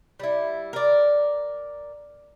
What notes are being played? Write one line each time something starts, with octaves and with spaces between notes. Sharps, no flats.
G3 E4
A#4 D5